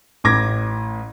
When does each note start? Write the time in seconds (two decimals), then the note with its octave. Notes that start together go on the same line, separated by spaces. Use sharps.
0.24 A1 A2 D6 G#6 A#6